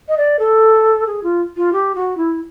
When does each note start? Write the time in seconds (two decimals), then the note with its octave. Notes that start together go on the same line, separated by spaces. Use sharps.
0.08 D#5
0.17 D5
0.39 A4
1.06 G#4
1.23 F4
1.56 F4
1.72 G4
1.95 F#4
2.17 E4